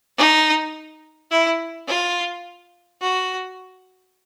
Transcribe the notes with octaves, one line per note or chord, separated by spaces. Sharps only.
D#4
E4
F4
F#4